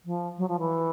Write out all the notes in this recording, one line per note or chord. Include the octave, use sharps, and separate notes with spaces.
F3
F#3
F3
E3